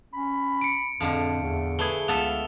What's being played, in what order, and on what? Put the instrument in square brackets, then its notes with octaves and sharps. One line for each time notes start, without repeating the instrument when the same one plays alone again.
[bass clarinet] C#4 [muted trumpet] B5
[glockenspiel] C#7 D7
[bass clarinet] F2 [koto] A2 D3 F3
[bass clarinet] E2 [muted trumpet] A3
[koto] A3 G#4 [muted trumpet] B4 [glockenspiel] G7
[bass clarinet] C#2 [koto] B3 A4 E5 [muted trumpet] F5 [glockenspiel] F7